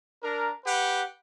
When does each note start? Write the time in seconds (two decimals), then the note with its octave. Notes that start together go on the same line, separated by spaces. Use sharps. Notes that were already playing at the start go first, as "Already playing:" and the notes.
0.21 D4 A#4
0.65 G4 B4 F#5